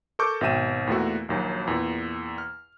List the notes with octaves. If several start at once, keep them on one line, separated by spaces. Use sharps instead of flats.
A4 A#4 A5 C#6 D6 G6
G#1 B2 E5 G5 D#7 E7
E2 A#2 A3 F#4
A#1 D#2 F#3 F#4
E2 A#2
F6